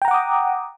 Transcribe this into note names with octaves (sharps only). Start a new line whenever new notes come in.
F#5 G5 A#5 D6 D#6